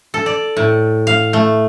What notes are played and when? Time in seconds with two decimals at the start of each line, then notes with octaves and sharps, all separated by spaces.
0.14 A4
0.26 D5
0.57 A2
1.07 F5
1.33 A3